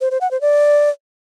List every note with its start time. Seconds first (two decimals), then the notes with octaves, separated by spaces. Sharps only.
0.01 C5
0.11 C5
0.21 F#5
0.31 C5
0.41 D5